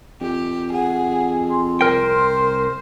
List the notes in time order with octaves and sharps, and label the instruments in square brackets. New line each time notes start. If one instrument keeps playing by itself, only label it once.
[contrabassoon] F2 [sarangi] G4
[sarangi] G#4 [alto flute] F#5
[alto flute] C6
[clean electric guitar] C2 A#4 G5 [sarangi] C5